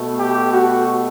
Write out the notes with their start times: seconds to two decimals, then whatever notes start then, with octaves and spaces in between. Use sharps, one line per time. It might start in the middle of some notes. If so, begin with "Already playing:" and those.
Already playing: B2 A3
0.18 G4
0.52 F#4